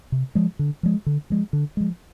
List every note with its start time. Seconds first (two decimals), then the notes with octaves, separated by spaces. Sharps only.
0.12 C3
0.35 F3 G#3
0.59 D3
0.83 F3 G#3
1.06 D3
1.30 F3 G#3
1.53 D3
1.77 F3 G#3